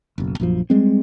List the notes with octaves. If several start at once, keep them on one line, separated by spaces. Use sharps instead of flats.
F#1 B1
A#1 F#2 F3
G3 G#3 C4